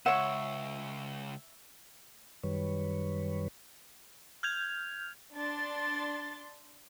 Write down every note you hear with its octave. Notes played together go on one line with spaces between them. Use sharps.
C#2 C#5 E5 F#5 C#6
F#2 D#3 G3 B4 C#5
F6 G6 G#6 F7
D4 C6 A6